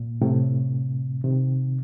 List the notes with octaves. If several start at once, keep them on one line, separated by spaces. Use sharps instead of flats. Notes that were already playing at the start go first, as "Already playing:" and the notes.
Already playing: A#2
A2 C3
C3 D#3